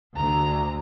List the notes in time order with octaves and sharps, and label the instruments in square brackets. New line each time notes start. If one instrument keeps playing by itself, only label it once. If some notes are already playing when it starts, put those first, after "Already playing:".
[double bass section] D2 [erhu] A#5